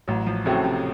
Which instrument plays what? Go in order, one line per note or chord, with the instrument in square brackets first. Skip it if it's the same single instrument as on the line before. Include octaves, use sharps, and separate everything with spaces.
[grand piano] A1 [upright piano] F#3
[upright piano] F3
[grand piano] A2 A3 C4 F#4 [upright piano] C#3
[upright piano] C3